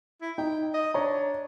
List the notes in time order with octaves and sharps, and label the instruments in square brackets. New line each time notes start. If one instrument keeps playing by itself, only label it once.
[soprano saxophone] E4
[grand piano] D#4 [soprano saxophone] G5
[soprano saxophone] D#5
[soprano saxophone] D4 [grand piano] C#5 A#5